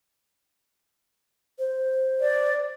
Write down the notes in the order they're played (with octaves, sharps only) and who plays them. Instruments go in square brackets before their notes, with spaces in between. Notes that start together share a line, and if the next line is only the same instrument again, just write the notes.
[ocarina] C5
[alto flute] D5